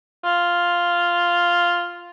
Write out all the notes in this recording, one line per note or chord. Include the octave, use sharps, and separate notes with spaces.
F4